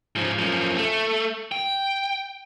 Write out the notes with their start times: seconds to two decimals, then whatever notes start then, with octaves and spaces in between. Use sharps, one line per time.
0.16 G#2 F3
0.38 F#2 F3
0.77 A3
1.52 G5